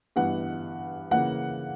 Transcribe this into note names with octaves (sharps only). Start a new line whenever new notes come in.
G2 E3 B3 F#5
C#3 E3 A#3 F#5